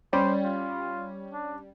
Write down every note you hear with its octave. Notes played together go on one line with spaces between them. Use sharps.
G3 C#4 C5
F4
D4